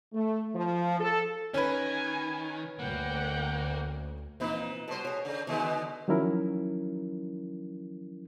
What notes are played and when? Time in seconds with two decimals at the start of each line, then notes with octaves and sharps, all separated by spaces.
0.14 A3
0.56 F3
1.00 A4
1.54 D#3 C#4 B4 G#5
2.79 D2 A#3 F#5 G5
4.40 F2 A#2 E3 C4 D#4 B4
4.88 B2 G3 A4 C5
5.05 G#4 C#5
5.25 C#3
5.47 B2 D3 D#3 G#3 B3
6.08 D#3 F3 F#3 C#4 E4 A#4